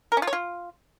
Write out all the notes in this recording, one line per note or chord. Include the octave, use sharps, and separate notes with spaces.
A#4
C#4
F4
C#5
F4